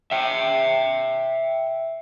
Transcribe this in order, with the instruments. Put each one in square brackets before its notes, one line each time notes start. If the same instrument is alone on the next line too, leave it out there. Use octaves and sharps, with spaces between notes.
[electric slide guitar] E5 G5